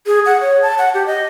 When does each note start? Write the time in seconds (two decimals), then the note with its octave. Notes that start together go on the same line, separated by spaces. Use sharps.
0.06 G#4
0.26 F#5
0.41 C#5
0.62 A5
0.78 F#5
0.94 G4
1.07 D#5